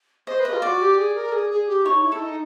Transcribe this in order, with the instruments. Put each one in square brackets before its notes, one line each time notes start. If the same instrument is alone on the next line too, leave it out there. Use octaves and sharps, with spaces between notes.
[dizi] C5 [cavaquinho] D#5
[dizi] B4 [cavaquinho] D#5
[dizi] F4
[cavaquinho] D5
[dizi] F#4
G4
G#4
A#4
G#4
G#4
G4
[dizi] D#4 [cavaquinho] C#5
[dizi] E4
[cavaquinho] A4
[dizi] D#4